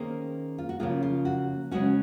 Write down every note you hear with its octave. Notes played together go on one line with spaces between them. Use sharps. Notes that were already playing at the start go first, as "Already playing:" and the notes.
Already playing: D#3 A#3 C#4 G#4 C5
F4
F#4
C#3 F3 A#3 F4 G#4
F4
F#4
C#3 G#3 C#4 F#4